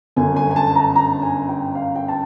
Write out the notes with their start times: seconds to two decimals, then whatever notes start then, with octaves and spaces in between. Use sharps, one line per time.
0.16 G1 F#2 D3 G#5
0.36 G#5
0.51 G#5
0.56 A5
0.76 A#5
0.96 A#5
1.22 G#5
1.49 G5
1.75 F5
1.95 G5
2.08 A5